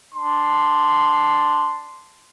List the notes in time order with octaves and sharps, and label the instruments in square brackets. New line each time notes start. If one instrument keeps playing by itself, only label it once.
[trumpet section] D4 C6